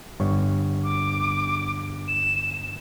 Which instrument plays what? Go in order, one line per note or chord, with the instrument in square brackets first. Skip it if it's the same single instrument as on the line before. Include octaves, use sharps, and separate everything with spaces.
[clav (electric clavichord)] G1 G2 C#5
[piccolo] D6
E7